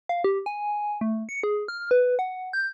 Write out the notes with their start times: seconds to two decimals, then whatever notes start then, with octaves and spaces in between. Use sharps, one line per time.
0.09 F5
0.24 G4
0.46 G#5
1.01 A3
1.29 C#7
1.43 G#4
1.68 F6
1.91 B4
2.19 F#5
2.53 G6